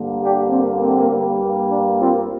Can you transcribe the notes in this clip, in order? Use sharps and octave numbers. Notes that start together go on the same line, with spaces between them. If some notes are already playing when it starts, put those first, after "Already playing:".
Already playing: G2 D3 A#3
D4 G4
C4
C4
G2 G3 A#3
D4
C4 F4